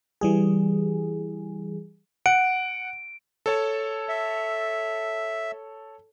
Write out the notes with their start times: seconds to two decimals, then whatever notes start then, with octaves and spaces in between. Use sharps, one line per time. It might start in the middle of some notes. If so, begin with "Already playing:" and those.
0.21 E3 G3 G#4
2.26 F#5 D7
3.46 A4 C#5 A5
4.09 E5